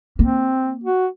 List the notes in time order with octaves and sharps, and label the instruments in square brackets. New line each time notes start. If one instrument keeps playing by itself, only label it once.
[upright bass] A#3 [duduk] C4
[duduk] F#4